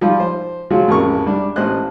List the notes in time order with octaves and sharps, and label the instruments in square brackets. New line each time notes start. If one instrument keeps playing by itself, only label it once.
[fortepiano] F3 G3 D#4 F4
C5
F3 F#3 G#3 F4 F#4
A1 F2 C#3 A#4 C#6
G3 D4
A1 C5 D#5 F#6